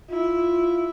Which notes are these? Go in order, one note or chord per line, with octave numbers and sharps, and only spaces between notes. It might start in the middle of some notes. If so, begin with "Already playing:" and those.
E4 F4